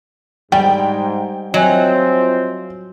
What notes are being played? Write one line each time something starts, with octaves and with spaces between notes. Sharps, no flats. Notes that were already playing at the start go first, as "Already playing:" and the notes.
G#2 G3 G5
F3 F#3 C4 D#5 E5 G#5